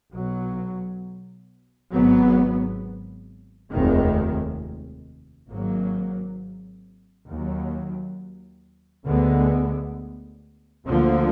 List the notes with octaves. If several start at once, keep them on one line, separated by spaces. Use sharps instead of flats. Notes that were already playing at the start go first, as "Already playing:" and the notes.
B1 B2 F#3
G#1 G#2 F#3 B3
F1 D#2 D#3 G#3
G#1 G#2 F#3 A#3
D#2 D#3 F#3
D2 D3 G#3 B3
D2 D3 F3 A#3